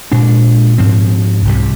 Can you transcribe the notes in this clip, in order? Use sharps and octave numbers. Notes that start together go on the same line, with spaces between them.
A#2 G#3 D4
G#2 F3 C4
C2 C3 G3